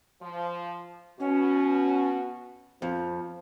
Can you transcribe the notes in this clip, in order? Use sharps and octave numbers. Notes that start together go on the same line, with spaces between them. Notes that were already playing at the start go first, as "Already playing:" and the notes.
F3
B2 C#4 F#4
F2 F3